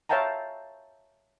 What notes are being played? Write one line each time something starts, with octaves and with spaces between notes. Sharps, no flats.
C#5 E5 F5 G5 A5 A#5